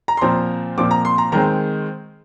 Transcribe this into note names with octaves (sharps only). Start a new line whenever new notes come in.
A#5
C6
A#2 F3 C4 A#5
A#2 F3 C4 D6
A#5
C6
A#5
D#3 G#3 C4 A#5